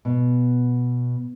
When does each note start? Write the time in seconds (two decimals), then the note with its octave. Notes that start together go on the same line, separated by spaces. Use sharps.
0.05 B2